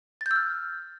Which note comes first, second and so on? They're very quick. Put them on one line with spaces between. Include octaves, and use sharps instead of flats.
A6 G6 E6 F6